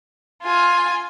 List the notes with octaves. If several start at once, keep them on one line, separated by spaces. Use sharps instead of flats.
F4 G#5